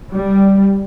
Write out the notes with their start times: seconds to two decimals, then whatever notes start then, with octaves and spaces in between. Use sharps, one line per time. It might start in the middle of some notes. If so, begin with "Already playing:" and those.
0.11 G3